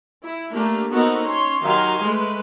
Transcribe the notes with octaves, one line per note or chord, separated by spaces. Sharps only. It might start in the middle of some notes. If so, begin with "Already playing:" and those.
E4
A3 A#3 D4 G4
B3 D#4 F#4 A4 A#4 C5
C#4 C#5 C6
D#3 F#3 G4 F5 G#5 C6
G#3 A3 B4